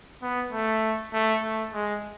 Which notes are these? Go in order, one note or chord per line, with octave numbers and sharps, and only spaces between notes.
B3
A3
A3
A3
G#3